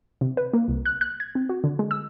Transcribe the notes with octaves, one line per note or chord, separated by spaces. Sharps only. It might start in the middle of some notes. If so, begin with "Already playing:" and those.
C3
B4
A#3
C2
F#6
F#6
G#6
C4
F#4
D3
G#3
E6